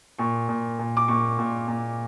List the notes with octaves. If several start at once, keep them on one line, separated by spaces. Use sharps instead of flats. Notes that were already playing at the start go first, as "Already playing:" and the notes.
A#2 C#6
A#2
A#2
D6
A#2 C#6
A#2
A#2